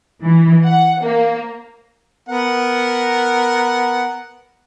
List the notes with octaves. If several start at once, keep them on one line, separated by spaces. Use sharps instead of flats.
E3
F#5
A#3
B3 A#4 F#5